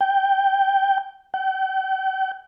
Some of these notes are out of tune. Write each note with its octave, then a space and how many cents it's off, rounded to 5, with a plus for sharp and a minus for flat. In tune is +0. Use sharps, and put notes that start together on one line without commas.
G5 -5
G5 -40